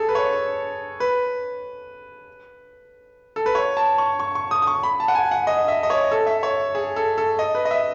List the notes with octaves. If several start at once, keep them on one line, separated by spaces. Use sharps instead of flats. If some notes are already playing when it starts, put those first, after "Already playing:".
Already playing: G#4 A4
B4
C#5
B4
A4
B4
C#5
A5
C#6
C#6
C#6
D#6
D#6
C#6
B5
A5
F#5
G#5
F#5
D#5
E5
D#5
C#5
A4
E5
C#5
G#4
A4
A4
D#5
B4
D#5
E5